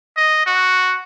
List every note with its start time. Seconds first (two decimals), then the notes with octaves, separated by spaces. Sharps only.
0.17 D#5
0.46 F#4